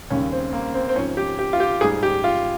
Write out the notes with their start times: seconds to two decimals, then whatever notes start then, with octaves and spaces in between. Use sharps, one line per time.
0.10 D#2 C#3 G3 C#4
0.32 C4
0.53 A#3
0.74 C4
0.89 C4
0.95 G#2 F3 C#4
1.17 G4
1.39 G4
1.53 F4
1.60 G4
1.81 G#2 G3 G#4
2.03 G4
2.24 F4